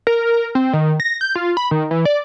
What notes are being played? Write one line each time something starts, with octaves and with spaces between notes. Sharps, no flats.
A#4
C4
D#3
A#6
G6
F4
B5
D#3
E3
D5